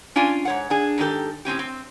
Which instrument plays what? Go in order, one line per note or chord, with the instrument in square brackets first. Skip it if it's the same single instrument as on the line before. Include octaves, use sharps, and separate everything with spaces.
[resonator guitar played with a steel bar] C#4 D4 F4 D5 G#5
G#2 C#5 F#5
D4 G#4
G#2 D#3 F#3 G4 A4
A2 C4 C#4 G4
C4